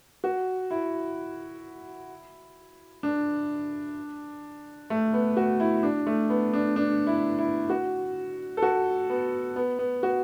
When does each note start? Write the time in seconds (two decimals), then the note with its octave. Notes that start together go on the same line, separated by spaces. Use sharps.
0.24 F#4
0.71 E4
3.03 D4
4.90 A3
5.13 B3
5.37 F#4
5.60 E4
5.83 D4
6.07 A3
6.30 B3
6.54 D4
6.76 D4
7.07 E4
7.39 E4
7.70 F#4
8.57 A4
8.62 F#4
9.10 B3
9.56 B3
9.79 B3
10.03 F#4